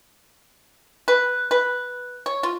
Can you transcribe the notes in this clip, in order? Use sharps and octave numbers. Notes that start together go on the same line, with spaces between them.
B4
B4
C#5
F4